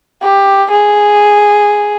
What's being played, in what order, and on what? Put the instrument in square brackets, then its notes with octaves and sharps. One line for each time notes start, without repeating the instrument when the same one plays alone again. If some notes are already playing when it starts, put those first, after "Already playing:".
[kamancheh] G4
G#4